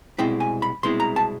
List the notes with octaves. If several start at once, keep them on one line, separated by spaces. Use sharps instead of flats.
C2 B2 G#3 C4 E4 G5
G#5
B5
C2 B2 G#3 C4 E4 C6
A#5
A5